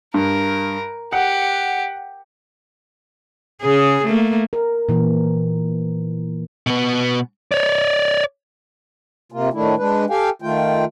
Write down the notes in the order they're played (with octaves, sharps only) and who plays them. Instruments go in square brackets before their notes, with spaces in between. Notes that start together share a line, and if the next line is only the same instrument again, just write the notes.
[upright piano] G2 [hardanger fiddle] A#4
[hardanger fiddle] G4 [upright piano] F#5
[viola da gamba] C#3 G#4
A3 A#3
[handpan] A#4
A#2 E3
[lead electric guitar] B2 B3
C#5 D5
[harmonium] C3 A#3 F4
A2 D#3 A3 D4 E4
G#3 D4 B4
G4 A4 F5 G5 G#5
D#3 A3 F4 G5